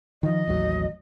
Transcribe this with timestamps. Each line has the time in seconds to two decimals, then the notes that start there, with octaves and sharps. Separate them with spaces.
0.23 D#3 F3 D#5
0.48 A1 D#2 F#3